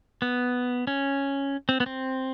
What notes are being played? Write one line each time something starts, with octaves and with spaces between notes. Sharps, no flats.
B3
C#4
C4
B3
C4